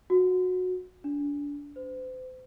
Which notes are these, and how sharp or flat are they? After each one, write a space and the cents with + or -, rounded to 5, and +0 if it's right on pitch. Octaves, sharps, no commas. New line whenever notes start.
F#4 -15
D4 -30
C5 -40